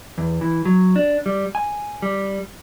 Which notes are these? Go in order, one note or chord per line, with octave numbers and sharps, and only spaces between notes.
E2
E3
F#3
D4
G3
G#5
G3